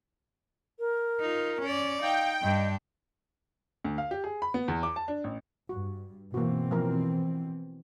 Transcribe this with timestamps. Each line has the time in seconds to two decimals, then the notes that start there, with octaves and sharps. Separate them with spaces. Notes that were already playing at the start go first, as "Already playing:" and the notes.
0.79 A#4
1.21 D#4 F4
1.61 C#4 D5
2.02 D#4 F5 G5
2.42 G2 D4 D#5
3.85 D2
3.98 F5
4.11 G4
4.24 G#4
4.42 B5
4.54 B3
4.68 E2
4.83 D6
4.96 A5
5.08 D4
5.24 A1
5.69 G2 F#4
6.34 B2 E3 A#3 C4 F#4
6.71 F3 A#4